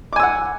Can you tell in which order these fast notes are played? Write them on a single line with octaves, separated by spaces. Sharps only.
D6 G#5 E6 F#5